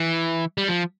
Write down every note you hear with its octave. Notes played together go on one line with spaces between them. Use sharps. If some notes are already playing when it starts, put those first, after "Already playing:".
Already playing: E3
G3
F3